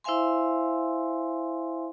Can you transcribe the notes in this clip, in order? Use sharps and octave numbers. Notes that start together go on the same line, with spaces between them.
E4 C5 E5 F5 G#5 C6